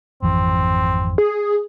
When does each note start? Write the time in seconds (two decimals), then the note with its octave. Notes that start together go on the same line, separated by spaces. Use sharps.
0.22 G#1 F2 E3 C4
1.18 G#4